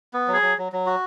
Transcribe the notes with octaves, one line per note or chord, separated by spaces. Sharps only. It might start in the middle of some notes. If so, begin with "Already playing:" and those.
B3
F#3
G#4
F#3
F#3
F#3
F#4